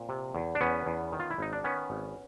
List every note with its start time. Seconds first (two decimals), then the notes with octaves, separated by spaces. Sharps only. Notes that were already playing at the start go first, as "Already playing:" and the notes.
Already playing: A#2 C4
0.09 C3
0.35 E2
0.55 D4
0.61 E2 B3 C#4
0.86 E2
1.12 D#3
1.20 F4
1.30 E4
1.38 G#1 D#4
1.53 D4
1.64 D#3 B3 C#4
1.90 G#1